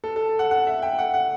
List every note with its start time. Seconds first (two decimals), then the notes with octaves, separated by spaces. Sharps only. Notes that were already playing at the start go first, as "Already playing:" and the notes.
0.04 A4
0.16 A4
0.39 F#5
0.51 F#5
0.67 E5
0.82 G5
0.99 F#5
1.14 F#5